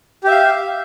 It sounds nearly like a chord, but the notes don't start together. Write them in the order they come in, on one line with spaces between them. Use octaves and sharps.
G4 E5 F5